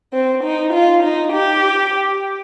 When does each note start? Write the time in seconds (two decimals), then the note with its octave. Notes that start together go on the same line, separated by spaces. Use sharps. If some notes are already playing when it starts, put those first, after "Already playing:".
0.13 C4
0.44 D#4
0.73 F4
1.04 D#4
1.33 G4